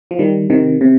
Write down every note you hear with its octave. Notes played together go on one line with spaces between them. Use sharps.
F3
D#3 G3
C3 D#3
C3